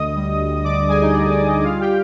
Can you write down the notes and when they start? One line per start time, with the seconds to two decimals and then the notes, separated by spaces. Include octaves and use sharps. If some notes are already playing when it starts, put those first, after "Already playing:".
Already playing: D2 D3 D#5 D#6
0.15 G3
0.39 D2
0.63 D3 D5 D6
0.88 G3 G#4 G#5
1.01 D#4 D#5
1.13 D3 D5
1.30 D5
1.39 G3
1.47 D#4 D#5
1.63 G3 F4 F5
1.80 G4 G5